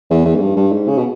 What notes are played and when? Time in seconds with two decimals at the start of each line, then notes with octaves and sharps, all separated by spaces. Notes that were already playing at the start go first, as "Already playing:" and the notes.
0.10 E2
0.26 E2
0.35 G#2
0.41 G2
0.56 G2
0.72 G#2
0.88 C#3
0.97 B2